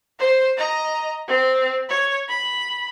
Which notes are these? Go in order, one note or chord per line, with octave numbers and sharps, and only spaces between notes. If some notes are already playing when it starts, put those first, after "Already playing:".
C5
D#5 A#5
C4
C#5
B5